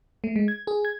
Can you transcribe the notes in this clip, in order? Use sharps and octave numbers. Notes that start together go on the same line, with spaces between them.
A3
G#3
G#6
G#4
G#6